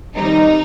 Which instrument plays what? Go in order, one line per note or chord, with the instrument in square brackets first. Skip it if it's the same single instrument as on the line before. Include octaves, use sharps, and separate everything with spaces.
[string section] D#3 G3 C4 D#4